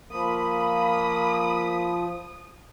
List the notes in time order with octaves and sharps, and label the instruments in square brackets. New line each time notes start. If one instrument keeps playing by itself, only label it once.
[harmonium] F3 [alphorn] A#3 [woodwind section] B5 [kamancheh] D#6